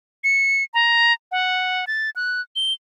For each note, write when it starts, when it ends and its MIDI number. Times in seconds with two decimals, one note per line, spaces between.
0.24 0.64 97
0.74 1.13 82
1.32 1.85 78
1.87 2.10 93
2.16 2.41 90
2.56 2.73 103